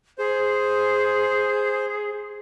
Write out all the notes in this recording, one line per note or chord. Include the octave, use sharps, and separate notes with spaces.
G#4 C5